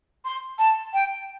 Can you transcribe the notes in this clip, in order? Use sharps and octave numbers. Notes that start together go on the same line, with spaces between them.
C6
A5
G5